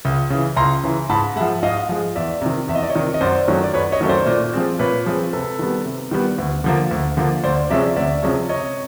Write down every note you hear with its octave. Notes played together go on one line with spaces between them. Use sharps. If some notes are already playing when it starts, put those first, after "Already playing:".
C#2
C#3 E3
C#2 A#5 C6
C#3 E3
G#2 A5 B5
G#3 E5 F#5
F3
G#2 D#5 F5
F3 G#3
E2 D5 E5
C3 D#3
E2 E5
D#5
D5
C#5 D#5
C3 D#3
D#5
F#2 C5 D5
D#3 F#3 A3 C#4
D5
F#2 B4 C#5
C#5 D#5
D#3 F#3 A3 C#4
C5 D5
A#2
F3 G#3 C4
A#2 B4 C#5
F3 G#3 C4
C3 A4 B4
D#3 G3 B3
C3
D#3 G3 B3
D2
D3 F3 A#3
D2
D3 F3 A#3
D2 C5 D5
C3 F3 G#3 C#4 D5 E5
D2 D5 E5
C3 F3 G#3 C#4
C3 C#5 D#5